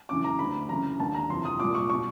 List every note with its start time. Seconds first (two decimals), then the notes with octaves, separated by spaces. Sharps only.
0.09 F#2 C#3 E3 D6
0.24 A#5
0.39 D2 D3 B5
0.69 F#2 C#3 E3 A#5
1.00 D#2 D3 A5
1.15 A#5
1.30 F2 C3 E3 C6
1.45 D#6
1.59 C2 A#2 D6
1.75 C#6
1.90 B2 C#6